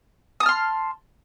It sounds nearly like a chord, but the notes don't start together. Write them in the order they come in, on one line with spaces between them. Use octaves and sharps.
D#6 A5 F6 C6